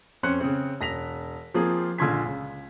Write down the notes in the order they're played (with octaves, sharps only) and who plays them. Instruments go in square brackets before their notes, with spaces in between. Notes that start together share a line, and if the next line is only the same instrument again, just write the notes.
[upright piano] F2 C#4 C5 F#6 C#7
C#3 C4
E1 A#6 B6 F7
F3 A#3 C4 F4 G#4
A#1 D3 F4 C6 G#6 B6
C#2